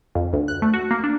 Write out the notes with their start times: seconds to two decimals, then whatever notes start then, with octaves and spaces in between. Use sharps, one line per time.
0.15 F2
0.33 D2
0.48 F#6
0.62 A3
0.74 F#4
0.91 A#3
1.04 D4